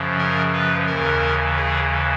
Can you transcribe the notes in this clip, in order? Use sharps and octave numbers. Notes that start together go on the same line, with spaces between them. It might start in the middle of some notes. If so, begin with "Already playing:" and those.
Already playing: F#2 C#3 F3
A#4
B4
D#2 C#3 E3 A#4
G#4